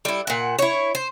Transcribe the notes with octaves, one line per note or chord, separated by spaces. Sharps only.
G3 E4
A#2 F#5
E4 C#5
C5